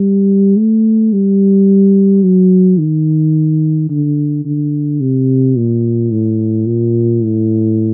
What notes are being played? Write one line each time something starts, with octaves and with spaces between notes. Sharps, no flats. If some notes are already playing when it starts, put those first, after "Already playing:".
Already playing: G3
A3
G3
F#3
D#3
D3
D3
C3
A#2
A2
A#2
A2